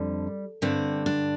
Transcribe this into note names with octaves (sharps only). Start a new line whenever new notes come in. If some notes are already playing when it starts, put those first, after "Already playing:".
Already playing: F2 D3 G3
G2 D3 C4
D4